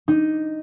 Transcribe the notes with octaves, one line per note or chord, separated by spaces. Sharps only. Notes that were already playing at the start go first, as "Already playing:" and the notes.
D#4